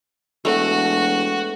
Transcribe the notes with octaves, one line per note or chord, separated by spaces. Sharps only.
E1 A3 F#4